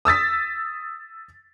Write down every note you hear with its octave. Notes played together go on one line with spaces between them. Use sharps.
D#6 E6 A6 B6